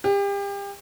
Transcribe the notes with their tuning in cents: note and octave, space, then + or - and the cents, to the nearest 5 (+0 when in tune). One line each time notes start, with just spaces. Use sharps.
G4 +35